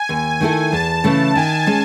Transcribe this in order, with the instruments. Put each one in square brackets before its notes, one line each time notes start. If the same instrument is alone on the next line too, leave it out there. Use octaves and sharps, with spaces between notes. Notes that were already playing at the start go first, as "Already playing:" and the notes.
Already playing: [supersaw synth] G#5
[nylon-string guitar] D#2
D#3 A3 E4 A4
[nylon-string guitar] E2 [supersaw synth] A5
[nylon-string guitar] C#3 E3 A3
[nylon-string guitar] D#3 [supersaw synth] G#5
[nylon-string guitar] G#3 C#4